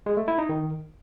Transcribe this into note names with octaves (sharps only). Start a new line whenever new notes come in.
G#3
A3
E4
D#4
D#3